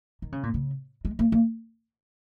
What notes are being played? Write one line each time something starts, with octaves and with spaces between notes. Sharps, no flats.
D#3
C#3
A#2
C#3
G#3
A#3
A#3